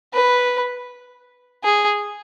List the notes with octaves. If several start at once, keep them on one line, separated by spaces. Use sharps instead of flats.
B4
G#4